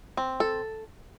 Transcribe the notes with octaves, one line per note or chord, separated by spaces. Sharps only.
C4
A4